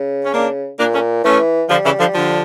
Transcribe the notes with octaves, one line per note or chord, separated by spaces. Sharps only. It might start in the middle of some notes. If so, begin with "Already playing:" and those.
Already playing: C#3
C#4
A#3 D4
A#2 A#3 D4
A3 C#4
E3 A3 C#4
D3 F3 G3
C#3 E3
D3 F3
D3 F3